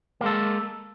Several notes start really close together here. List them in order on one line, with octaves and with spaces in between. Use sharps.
A#3 G#3 A4